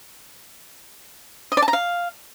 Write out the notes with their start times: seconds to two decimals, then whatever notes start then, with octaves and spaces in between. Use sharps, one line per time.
1.52 D#5
1.57 D5
1.62 A5
1.68 A#5
1.73 F5